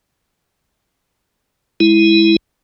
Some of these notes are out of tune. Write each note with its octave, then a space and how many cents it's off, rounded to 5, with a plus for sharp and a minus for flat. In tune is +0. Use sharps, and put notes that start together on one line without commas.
G#3 +0 E4 +0